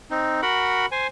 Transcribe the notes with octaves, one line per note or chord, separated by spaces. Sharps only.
C4 D#4
F#4 A#4 F#5 B5
C5 G#5